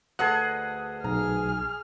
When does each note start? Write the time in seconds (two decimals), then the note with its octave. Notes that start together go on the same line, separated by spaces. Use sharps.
0.19 D2 G#4 A4 B4 D#5 F#5 F#6
1.04 B1 G#4 A#5 F6